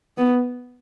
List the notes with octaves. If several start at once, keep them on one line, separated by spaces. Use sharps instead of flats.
B3